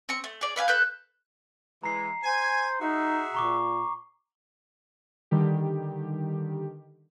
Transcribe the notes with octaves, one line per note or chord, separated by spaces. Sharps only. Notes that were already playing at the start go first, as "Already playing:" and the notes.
C4 C#6
A3
G#4 D5
B4 E5 F5 G#5
A4 B4 F#6 G6
E3 G#3 A#5 C7
C5 G#5
D#4 F#4 G#4 E5
A#2 A#5 C#6 D6
D3 D#3 G3 G4